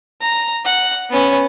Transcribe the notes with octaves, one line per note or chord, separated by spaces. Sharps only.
A#5
F#5
B3 C#4